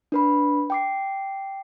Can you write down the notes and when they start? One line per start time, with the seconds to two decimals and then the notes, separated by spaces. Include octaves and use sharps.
0.12 D4 B4 B5
0.70 G5 D6 C7